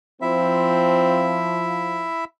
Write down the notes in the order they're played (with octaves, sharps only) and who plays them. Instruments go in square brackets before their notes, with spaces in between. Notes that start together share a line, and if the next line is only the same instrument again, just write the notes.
[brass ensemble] F3 [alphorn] C4 [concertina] E4 E5